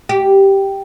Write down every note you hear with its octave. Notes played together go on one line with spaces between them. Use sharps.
G4